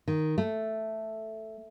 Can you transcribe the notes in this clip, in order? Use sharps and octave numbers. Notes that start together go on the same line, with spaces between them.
D#3
A3